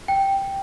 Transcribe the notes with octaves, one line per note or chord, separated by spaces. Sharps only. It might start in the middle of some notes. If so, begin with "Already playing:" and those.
G5